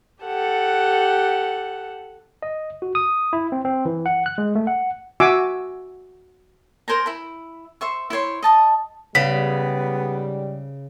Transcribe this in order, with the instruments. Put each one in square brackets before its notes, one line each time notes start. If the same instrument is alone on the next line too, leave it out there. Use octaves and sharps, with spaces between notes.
[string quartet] G4 A4 F#5
[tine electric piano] D#5
F#4
D#6
E4
C4
C4
E3
F#5
F#6
G#3
A3
F#5
[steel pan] F#4 E5 G#5 D6 E6
[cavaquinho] A#4 C5 G#5 A#5
E4 B5
C5 E5 C#6
E4 C5 C#5 C6
D#5 A5 D#6
[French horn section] G#2 G3 [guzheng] C#3 [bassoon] B3 [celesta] B6